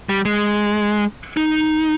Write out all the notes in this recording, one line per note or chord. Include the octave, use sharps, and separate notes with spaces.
G3
G#3
D#4